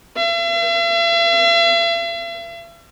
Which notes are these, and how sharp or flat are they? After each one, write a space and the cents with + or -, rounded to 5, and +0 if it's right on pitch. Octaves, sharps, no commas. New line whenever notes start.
E5 +45